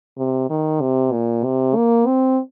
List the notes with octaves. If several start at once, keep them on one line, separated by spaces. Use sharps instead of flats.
C3
D#3
C3
A#2
C3
A#3
C4